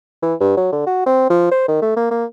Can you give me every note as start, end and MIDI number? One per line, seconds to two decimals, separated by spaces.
0.23 0.34 52
0.40 0.52 43
0.57 0.70 54
0.73 0.84 50
0.87 1.03 66
1.06 1.25 60
1.30 1.47 53
1.51 1.67 72
1.68 1.80 51
1.82 1.92 57
1.97 2.07 58
2.11 2.25 58